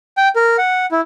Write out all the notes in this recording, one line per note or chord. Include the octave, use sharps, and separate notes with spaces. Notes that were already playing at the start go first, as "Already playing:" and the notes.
G5
A#4
F#5
E4